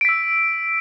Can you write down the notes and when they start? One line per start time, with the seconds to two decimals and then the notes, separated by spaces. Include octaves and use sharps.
0.01 D7
0.05 B6
0.09 E6